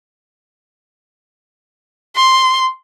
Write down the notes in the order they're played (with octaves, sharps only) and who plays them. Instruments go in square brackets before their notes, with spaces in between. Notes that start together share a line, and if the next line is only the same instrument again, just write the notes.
[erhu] C6